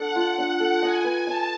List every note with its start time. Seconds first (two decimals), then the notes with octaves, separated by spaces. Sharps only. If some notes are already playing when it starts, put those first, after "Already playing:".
Already playing: D4 A4 F#5
0.15 F4
0.38 D4 F#5
0.60 A4
0.82 D#5 G#5
1.04 B4
1.27 D#5 A5